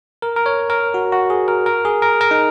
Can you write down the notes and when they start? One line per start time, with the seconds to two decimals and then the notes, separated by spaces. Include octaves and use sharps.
0.22 A#4
0.36 A#4
0.46 C#5
0.70 A#4
0.94 F#4
1.12 F#4
1.30 G#4
1.48 A#4
1.66 A#4
1.85 G#4
2.02 A#4
2.21 A#4
2.31 D#4